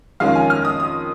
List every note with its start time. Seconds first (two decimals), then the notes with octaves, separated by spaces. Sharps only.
0.20 F2 D#3 G#3 C#4 F5
0.35 G#5
0.50 F6
0.65 D#6
0.80 D#6